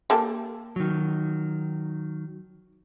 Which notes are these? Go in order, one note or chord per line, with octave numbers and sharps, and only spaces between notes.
A#3 G4 A4
D#3 F#3